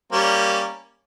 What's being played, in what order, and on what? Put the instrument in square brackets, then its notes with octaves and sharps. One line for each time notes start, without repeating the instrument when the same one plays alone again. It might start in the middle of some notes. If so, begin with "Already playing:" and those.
[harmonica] G3 A#3 C#4